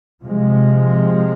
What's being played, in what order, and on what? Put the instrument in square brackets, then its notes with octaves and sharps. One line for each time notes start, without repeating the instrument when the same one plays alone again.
[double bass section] C3 F3 G#3